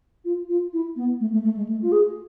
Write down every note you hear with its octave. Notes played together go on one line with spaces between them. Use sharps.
F4
F4
E4
B3
A3
A3
A3
G#3
A3
F4
G#4